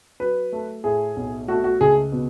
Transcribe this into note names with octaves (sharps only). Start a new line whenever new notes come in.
F#3 B4
A3
A2 G#4
B1
A3 F#4
F#4
C#2 G#4
B2